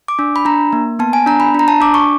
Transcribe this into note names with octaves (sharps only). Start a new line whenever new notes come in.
D6
D4
B5
D4 A#5
A#3
B3 A5
G#5
D4 A#5
B5
D4 A#5
A5
D4 D6
C#6